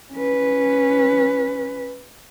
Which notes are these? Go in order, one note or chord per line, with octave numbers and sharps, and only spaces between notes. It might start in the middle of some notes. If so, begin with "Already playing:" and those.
C#4 B4